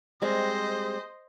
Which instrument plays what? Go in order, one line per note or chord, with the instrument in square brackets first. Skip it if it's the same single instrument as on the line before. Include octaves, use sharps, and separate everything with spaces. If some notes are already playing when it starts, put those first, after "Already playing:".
[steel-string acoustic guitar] G3 G#3 C4 [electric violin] C5 D#5